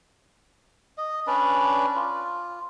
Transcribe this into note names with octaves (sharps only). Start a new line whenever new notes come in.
D#5
C#4 D4 B4 D5
F4